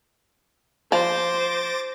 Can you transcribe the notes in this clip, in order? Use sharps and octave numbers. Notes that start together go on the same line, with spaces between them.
F3 C5 D6 A6 A#6